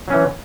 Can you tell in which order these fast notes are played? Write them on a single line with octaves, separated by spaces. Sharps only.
F#3 C#4 E3